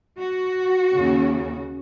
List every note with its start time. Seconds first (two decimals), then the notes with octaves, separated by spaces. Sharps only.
0.18 F#4
0.93 D#2 C#3